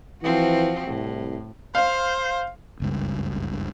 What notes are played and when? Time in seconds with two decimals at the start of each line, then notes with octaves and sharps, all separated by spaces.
0.23 E3 F3 C4 F#4
0.87 C2 A2
1.75 C5 F5
2.80 F#1 C#2 G2